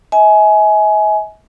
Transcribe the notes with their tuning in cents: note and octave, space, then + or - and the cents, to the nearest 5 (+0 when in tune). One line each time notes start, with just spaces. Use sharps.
E5 -45 G#5 +20